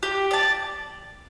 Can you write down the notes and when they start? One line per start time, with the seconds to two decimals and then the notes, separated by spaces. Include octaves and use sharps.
0.03 G4
0.31 D5 A5